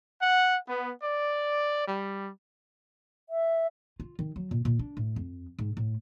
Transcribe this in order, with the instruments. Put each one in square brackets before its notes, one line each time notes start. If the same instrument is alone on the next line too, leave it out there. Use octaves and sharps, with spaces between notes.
[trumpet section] F#5
B3
D5
G3
[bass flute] E5
[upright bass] F4
D#3
F#3
A#2
A#2
D4
A2
F2
G#2
A2